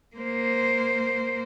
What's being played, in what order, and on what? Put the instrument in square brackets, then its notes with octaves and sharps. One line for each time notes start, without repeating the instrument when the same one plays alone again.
[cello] A#3 C5